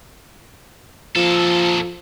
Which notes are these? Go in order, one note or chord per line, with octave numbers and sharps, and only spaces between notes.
A#2 F3 A4